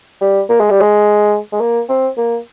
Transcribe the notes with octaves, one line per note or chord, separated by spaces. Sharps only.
G3
A#3
G#3
G3
G#3
G#3
A#3
C4
A#3